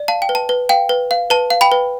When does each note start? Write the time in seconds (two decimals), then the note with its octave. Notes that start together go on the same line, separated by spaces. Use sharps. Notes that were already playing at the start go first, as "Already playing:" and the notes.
Already playing: D5
0.08 F5 A5
0.22 G5
0.29 B4
0.35 A5
0.49 B4
0.69 F5 G5
0.89 B4
1.11 F5
1.30 B4 A5
1.50 F5
1.61 G5 B5
1.72 B4